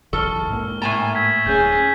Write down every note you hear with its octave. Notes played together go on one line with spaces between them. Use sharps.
F#1 B1 E2 A4 C#6 F6 G7
G#2 A#3
A2 G#5 A#5 A6 E7
E6 G#6 B6
D1 C#4 G#4 G6